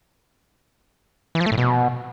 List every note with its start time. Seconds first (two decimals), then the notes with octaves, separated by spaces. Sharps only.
1.35 E3
1.41 F3
1.46 A3
1.52 A2
1.58 B2